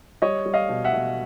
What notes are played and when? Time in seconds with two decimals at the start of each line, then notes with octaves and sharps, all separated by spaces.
0.22 G3 C#5 D#5
0.46 G3
0.53 D#5 F5
0.69 B2
0.84 E5 F#5
0.93 B2